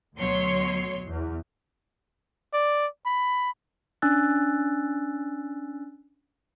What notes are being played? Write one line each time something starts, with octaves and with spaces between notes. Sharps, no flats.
D2 B2 F#3 C#5 C6 C#7
E2
D5
B5
C#4 D4 G#5 E6 F#6 A6